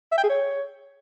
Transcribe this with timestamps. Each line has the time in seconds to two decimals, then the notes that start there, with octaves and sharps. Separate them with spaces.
0.12 E5
0.18 G5
0.24 G#4
0.29 C#5